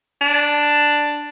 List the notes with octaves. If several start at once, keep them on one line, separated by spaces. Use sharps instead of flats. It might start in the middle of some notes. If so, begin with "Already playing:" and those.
D4